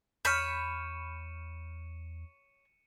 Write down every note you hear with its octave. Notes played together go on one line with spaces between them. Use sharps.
E2 C#5 B5 F6 G6 C#7 D#7 E7